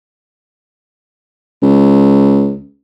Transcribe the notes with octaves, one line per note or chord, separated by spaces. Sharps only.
C#2